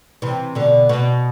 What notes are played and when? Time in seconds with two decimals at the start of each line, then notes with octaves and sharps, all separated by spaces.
0.22 C3 E3
0.55 B2 D3
0.89 B2